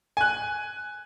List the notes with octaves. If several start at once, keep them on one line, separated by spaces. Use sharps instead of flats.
G#5 F#6